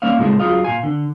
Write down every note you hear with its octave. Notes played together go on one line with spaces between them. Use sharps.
A#3 C#4 D5 E5 F5
A#2 C#3 G#3 E4 G#4 A4
F#3 F4 G#4 D#5 F5
A#2 F5 G#5
D3